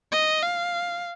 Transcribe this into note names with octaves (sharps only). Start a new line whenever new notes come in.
D#5
F5